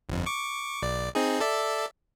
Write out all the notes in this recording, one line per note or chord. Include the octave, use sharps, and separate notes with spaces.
G1 F2
C#6 D6
B1 D5
C4 D#4 G#4
A4 D5 E5